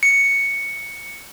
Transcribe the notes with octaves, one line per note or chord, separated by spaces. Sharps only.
C#7